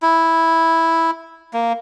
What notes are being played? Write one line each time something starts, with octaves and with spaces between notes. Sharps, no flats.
E4
A#3